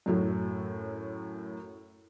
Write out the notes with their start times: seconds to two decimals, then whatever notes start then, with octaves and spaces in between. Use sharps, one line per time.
0.06 F#2 A2 F#3